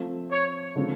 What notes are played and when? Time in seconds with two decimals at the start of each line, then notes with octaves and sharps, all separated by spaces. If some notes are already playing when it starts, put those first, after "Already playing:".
Already playing: F3 A3 C4 F4
0.30 C#5
0.75 D3 F3 G#3 C4 F4